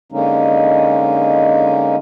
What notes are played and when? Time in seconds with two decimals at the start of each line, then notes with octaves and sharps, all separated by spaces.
0.12 D3 G#3 A#3 C#4 D#4